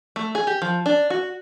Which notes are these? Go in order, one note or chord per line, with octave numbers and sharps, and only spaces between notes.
A3
G#4
G4
F3
D4
F#4